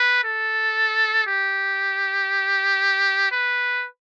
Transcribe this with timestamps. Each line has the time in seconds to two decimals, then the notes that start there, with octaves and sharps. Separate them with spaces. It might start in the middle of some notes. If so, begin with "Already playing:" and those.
Already playing: B4
0.24 A4
1.27 G4
3.32 B4